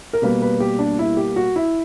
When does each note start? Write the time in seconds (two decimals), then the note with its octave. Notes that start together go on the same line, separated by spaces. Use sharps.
0.13 A#4
0.22 B2 G3 A#3 B4
0.42 B4
0.60 G4
0.79 D4
0.99 E4
1.17 G4
1.36 F#4
1.56 E4